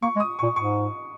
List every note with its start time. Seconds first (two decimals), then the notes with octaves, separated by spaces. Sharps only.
0.02 A#3 C#6
0.16 G#3
0.20 D#6
0.39 A#2 C#6
0.56 G#2 C#6